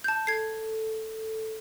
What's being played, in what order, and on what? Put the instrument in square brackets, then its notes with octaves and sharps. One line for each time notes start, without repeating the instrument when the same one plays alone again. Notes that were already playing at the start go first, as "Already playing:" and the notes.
[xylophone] A5 G6
[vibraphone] A4 [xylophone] G#6 C7